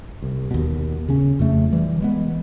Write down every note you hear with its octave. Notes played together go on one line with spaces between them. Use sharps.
C2
D#2 B2
C#3 C#4
F2 C#3 A3
E3 G3
E3 G#3 B3